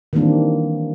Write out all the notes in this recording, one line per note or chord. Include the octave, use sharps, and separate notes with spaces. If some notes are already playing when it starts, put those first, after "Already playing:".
D#3 E3 G3 A#3 C4 D4